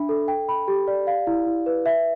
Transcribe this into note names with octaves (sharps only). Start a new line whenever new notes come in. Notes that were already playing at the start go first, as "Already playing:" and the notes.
Already playing: D4 E5 B5
A4
G5
B5
G4
D5
F5
E4
E4
B4
E5